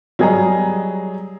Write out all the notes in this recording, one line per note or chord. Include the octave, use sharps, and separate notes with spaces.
F#3 G3 G#4 D#5 A#5